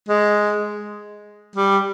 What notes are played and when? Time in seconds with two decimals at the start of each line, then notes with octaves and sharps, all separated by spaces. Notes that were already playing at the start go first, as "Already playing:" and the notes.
0.09 G#3
1.56 G3